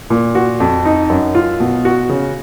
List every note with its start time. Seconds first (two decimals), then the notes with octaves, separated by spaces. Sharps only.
0.10 A#2
0.35 F#4
0.60 F2
0.85 D#4
1.10 F#2
1.35 F4
1.60 B2
1.85 F#4
2.09 C#3